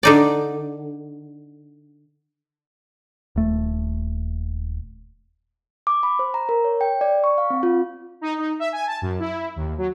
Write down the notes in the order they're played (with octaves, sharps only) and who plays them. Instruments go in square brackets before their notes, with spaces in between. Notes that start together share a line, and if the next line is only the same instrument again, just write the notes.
[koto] D3 D#4 D5
[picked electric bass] D#1 A3
[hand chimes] D6
B5
C5
A#5
A#4
C#5
G5
D5
C#6
F5
C4
F4
[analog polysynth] D#4
D#4
E5
G#5
A5
F#2
E4
D#2
F#3